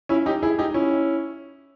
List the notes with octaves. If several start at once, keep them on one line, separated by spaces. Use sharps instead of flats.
C#4 E4
D#4 G4
E4 G#4
D#4 G4
C#4 E4